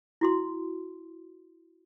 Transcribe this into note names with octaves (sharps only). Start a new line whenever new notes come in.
E4 F#4 C6